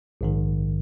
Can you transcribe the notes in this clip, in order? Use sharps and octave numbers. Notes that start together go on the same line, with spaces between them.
A#1 G#2 D#3